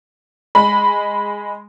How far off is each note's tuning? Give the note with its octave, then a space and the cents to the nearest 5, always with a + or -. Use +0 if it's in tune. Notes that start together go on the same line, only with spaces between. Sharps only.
G#3 -10 B5 +0